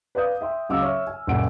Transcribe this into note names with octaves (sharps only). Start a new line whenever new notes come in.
B4 D5 F5 D#6 G6
E5 G5 C6
C#2 F#3 F5 D6 E6
C#5 E5 F6
G#5
F#1 A#2 F#5 D7